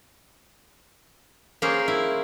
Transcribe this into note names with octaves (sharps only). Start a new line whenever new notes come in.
A#3 C#4 G#4 C5
E4